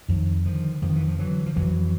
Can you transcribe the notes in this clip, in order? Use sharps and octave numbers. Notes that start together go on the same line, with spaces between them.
F2 D#3
D3 D#3 F3
F2 D#3 F3
E3
F3
D3 E3 F#3
F3
F2 E3 F#3